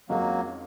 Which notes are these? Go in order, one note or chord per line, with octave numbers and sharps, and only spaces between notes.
F2 D#3 F#3 G#3 A#3 C#4